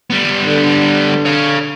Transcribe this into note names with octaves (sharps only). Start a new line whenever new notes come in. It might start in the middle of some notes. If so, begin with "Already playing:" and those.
G3 B3
D3
C#5 F5